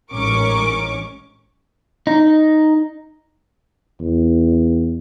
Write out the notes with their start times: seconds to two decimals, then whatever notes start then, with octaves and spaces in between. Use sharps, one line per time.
0.12 A1 G#2 C#4 A#4 C#6 D6
2.07 D#4
4.00 E2